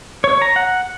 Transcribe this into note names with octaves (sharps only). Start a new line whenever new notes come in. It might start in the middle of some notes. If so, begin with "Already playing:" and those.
C#5
A#5
F#5